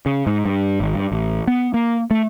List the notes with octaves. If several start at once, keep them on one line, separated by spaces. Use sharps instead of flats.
C#3
G#2
G2
G#1
G2
A1
B3
A#3
A3